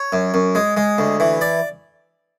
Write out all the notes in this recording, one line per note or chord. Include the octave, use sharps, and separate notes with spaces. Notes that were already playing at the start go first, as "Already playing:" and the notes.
Already playing: C#5
F#2
F#2
G#3
G#3
D2
E3
D5